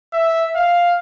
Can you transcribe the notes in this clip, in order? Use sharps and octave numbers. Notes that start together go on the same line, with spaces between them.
E5
F5